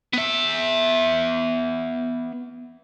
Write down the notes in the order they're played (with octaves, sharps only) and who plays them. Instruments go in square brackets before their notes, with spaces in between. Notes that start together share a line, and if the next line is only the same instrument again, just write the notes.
[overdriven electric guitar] B3 E5